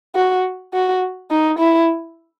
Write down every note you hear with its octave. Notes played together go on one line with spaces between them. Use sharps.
F#4
F#4
D#4
E4